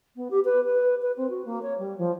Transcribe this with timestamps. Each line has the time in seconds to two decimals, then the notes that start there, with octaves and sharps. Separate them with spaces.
0.15 B3
0.30 G4
0.44 B4
0.64 B4
1.01 B4
1.16 C4
1.30 F#4
1.45 A#3
1.62 C#5
1.78 G3
1.98 F3